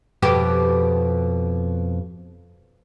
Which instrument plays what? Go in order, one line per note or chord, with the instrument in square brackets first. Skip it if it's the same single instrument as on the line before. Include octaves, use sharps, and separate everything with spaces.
[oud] F2 B2 G4